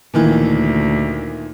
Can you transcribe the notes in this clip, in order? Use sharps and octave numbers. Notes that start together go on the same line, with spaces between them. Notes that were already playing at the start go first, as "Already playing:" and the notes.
D2 A#2 D#3 E3